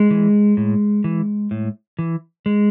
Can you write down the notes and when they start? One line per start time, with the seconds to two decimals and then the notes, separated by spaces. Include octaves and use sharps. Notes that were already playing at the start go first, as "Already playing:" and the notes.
Already playing: G#3
0.10 E3
0.57 A2
1.04 E3
1.51 A2
1.98 E3
2.46 G#3